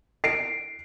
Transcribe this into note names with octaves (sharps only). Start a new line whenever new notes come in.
C7 D7